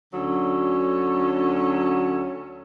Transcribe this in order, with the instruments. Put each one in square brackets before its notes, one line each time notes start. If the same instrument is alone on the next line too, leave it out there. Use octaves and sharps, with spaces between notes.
[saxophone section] D2 D3 F#3 C#4 A4